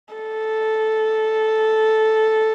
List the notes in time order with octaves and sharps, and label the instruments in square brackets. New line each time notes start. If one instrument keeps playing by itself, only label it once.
[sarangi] A4